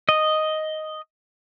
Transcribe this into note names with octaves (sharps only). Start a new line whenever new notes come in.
D#5